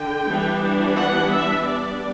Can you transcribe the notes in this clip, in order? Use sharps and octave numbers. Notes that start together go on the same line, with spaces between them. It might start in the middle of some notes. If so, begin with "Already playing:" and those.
Already playing: D3 G5
E3 G3 B3 D4
F#5
E5
G3 B3 D4 D5